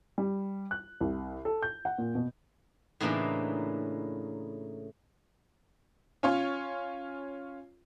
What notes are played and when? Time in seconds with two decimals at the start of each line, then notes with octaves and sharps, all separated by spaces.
0.18 G3
0.71 F#6
1.01 C2
1.45 A4
1.62 G6
1.85 F#5
1.98 A#2
2.15 B2
3.00 A2 C#3 E3 A#3 D4 D#4
6.23 C#4 F4 C#5